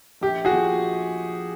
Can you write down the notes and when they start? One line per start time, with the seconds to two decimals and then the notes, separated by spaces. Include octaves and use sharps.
0.21 A#1 G4
0.45 F#4 G#4
0.53 F3